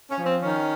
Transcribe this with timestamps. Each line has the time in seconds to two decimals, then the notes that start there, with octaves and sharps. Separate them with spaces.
0.09 C#4
0.18 F3
0.25 C4
0.41 D#3 C#4